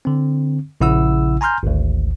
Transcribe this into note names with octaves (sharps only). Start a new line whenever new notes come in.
D3 C4
A#1 C#3 E4 F#5 E6
G#5 A#5 C6 F6 G6
G#1 D2